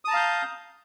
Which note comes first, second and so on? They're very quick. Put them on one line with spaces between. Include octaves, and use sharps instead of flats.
D#6 A5 A#5 F5 G6